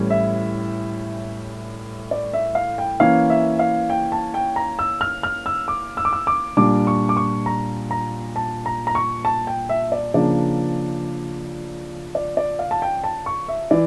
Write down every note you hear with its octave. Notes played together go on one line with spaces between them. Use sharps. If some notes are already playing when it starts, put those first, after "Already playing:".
Already playing: A2 E3 G3 C#4
E5
D5
E5
F5
G5
E3 A#3 C#4 F5
E5
F5
G5
A5
G5
A#5
E6
F6
F6
E6
D6
E6
D6
E6
D6
A#2 G3 D4 D6
C#6
D6
C#6
A#5
A#5
A5
A#5
A#5
C#6
A5
G5
E5
D5
C#3 F3 A#3 D4 D5
D5
D5
F5
A5
G5
A5
C#6
E5
E3 D5